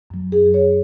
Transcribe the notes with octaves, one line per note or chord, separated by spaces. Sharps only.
F#2 F#3
G#4
C#5